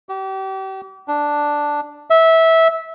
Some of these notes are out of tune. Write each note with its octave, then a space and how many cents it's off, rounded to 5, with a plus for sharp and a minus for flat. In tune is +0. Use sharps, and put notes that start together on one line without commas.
G4 -35
D4 +0
E5 -15